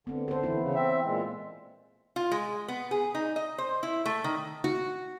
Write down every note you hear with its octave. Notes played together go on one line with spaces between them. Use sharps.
D3 B3 C4
A4 C5
E3 B3 E4
C#3
C4 E5
A#2 G#3
F4
G#3
B3
G#4
D#4
D#5
C5
E4
A3
D#3
F#4